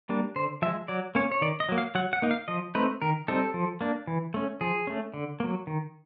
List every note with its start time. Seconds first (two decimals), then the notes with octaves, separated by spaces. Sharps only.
0.09 G3 A#3 D4
0.36 D3 C5
0.62 F3 E5
0.66 G#3
0.88 F#3 D5
1.15 A#3 C#4 C#5
1.32 C#5
1.42 D#3 D5
1.60 D#5
1.69 F#3 A#3
1.78 F5
1.95 F#3 F#5
2.13 F#5
2.22 A#3 D#4
2.31 F5
2.48 F3 D#5
2.75 A3 C4 D#4 B4
3.02 D#3 A#4
3.28 G3 C4 D#4 A4
3.54 F3
3.81 A#3 D4
4.07 E3
4.34 A3 C#4
4.61 F3 G#4
4.87 A3 C#4
5.14 D3
5.40 F#3 A#3
5.67 D#3